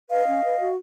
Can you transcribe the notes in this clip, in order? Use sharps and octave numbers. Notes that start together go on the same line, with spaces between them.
B4 D#5 F5
C#4
B4
F#4